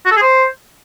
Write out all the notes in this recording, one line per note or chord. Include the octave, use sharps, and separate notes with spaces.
F#4
A4
G#4
C5